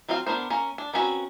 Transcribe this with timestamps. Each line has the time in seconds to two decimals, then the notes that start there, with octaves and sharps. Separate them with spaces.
0.09 F#3 C4 F4 C5 F5
0.27 B3 D4 A#4 C5
0.50 A#3 C#4
0.78 D4
0.94 A#3 C4 C#4 F#4 B4